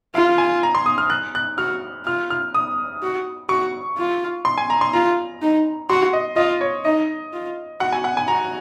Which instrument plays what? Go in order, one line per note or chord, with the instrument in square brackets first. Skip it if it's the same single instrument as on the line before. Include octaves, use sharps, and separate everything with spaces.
[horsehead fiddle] F4 [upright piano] F5
[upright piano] G#5
A#5
C6
D#6
F6
F#6
F#6
[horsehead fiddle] F#4 [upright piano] F6
[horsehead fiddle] F4 [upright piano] F6
[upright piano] F6
D#6
[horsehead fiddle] F#4
[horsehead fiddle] F#4 [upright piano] C#6
[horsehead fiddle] F4
[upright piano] C6
G#5
A#5
C6
[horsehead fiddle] F4 [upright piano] A#5
[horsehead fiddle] D#4
[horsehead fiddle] F#4 [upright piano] C6
[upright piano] D#5
[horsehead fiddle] F4 [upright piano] D#5
[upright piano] C#5
[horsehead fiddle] D#4 [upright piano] D#5
[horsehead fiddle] F4
[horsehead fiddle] F#4 [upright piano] F#5
[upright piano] G#5
F#5
G#5
[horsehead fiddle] F#4 [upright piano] A#5